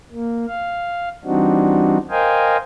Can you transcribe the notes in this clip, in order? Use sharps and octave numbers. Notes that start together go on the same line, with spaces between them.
A#3
F5
E3 G3 C4 D4 D#4 F#4
A#4 C5 D#5 F5 G5 G#5